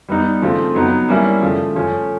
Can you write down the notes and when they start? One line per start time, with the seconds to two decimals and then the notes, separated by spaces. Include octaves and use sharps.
0.09 G3 B3 D#4
0.42 C#3 F3 A3 C4 F4
0.75 F#3 B3 D#4
1.08 G3 A#3 C#4 E4
1.41 C#3 F3 A3
1.75 F3 A3 C#4